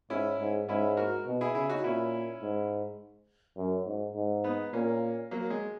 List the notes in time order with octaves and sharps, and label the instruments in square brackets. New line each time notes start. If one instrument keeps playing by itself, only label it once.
[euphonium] G#2 [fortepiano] C#4 E4
[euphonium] G#2
[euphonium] G#2 [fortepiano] C#4 E4
[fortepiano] F#4 A#4
[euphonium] B2
[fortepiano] E4 G#4
[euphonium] C#3 [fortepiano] E4 G#4
[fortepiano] D#4 F#4
[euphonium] A#2 [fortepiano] C#4 E4
[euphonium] G#2
F#2
G#2
G#2
[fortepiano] B3 D#4
[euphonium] A#2 [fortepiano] A#3 C#4
[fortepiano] F#3 A#3
G#3